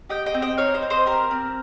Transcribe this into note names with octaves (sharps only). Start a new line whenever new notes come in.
G4 D#5 G5
D#5 G5
C4
D#5 G5
D#4 C#5 F5
C5 D#5
C4
C5 D#5
G4 A#4
C4